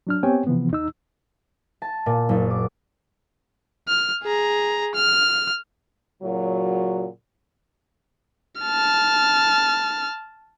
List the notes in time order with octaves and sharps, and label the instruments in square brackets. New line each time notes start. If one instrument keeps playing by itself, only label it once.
[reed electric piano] F#3 D4 F6
B3 C4 G4 C#5 G5 G#5
C3 E3 F3 B3
D#2 D#4 E6
[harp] A5
A#2
F#1
D6
[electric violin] F6
G#4 A#5
F6
[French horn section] A#2 C#3 F#3
[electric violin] A5 F6